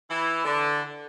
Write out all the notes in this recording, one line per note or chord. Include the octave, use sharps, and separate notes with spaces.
E3 E4
D3 D4